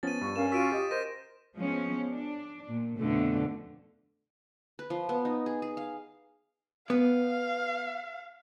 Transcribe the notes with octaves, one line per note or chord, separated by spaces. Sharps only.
F3 B3 C#4 A6 D#7
G2 C#6
C#4 A#4 F5 E7
F4 F#4 C#6 E6 B6 D7 D#7
G4 D#5
A#4 C5 A#6 D#7
F3 G#3 B3 C#4
D4
A#2
F2 B2 D3 A3
B4
F3
B3
D#4
G#4
G#4
F5
B3 F5